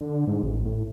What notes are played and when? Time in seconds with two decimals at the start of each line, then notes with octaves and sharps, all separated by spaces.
0.01 D3
0.28 G#2
0.43 A1
0.65 A2